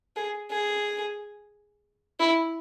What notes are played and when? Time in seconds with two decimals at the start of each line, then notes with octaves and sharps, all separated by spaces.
0.16 G#4
0.51 G#4
2.20 E4